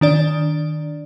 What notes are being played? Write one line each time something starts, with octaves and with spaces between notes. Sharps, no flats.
D#3 D4 D5